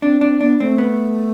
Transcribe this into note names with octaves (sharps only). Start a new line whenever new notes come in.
C4 D4
C4 D4
B3 D4
A3 C4
B3